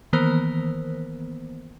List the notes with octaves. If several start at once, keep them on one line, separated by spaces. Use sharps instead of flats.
D#3 E3 A#3 B3 A#4 C5